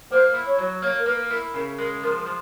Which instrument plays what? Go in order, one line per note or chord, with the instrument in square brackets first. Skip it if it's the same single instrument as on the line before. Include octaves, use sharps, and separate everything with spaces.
[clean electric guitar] A#3 [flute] C5
[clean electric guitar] E4
[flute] C#5
[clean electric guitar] F#3
[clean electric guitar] A#3 [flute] C#5
[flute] A#4
[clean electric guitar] A#3 [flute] B4
[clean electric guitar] E4 [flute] A#4
[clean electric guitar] C#3 [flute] A#4
[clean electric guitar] G#3 [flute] A#4
[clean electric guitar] F3 [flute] A#4
[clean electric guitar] F3